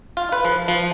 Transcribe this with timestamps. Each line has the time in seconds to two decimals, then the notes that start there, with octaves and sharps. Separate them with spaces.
0.17 F4
0.32 B4
0.45 F3
0.68 F3